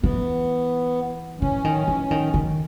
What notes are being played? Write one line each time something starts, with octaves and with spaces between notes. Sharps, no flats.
E3 B3
E3 C#4
D#3
E3
D#3
D#3